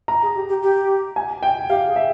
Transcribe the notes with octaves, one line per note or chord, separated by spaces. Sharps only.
A#5
G#4
G4
G4
G4
G#5
G5
G4 F5
G#4
E5